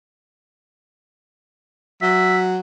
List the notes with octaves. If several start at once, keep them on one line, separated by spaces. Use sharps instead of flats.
F#3 E5